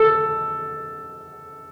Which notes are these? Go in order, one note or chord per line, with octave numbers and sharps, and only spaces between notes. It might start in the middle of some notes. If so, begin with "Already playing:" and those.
Already playing: A4